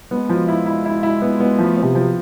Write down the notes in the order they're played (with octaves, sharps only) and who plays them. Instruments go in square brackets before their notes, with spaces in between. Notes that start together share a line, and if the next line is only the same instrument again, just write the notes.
[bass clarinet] G#3 [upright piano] B3
[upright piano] F3
E4
E4
E4
E4
B3
B3
[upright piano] F3 [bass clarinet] A3
[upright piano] C4
[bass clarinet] C3
[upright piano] F3